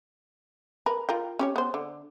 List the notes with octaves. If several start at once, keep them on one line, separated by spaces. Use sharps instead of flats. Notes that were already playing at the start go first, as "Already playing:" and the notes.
A#4 B4
F4 A#4 G5
C#4 G4 C#5
B3 C5
D3